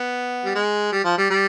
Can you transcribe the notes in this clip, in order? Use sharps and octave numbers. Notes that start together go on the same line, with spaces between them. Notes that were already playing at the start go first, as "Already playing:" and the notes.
Already playing: B3
G3
G#3
G3
F3
G3
G3